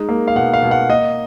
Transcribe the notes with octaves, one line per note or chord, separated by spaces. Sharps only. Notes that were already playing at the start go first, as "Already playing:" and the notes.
Already playing: G#3 D#4
A#3
F5
B2 F#5
F5
B2
F#5
A#3 D#5